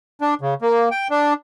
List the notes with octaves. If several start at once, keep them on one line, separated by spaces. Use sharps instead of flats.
D4
C#3
A#3
G5
D4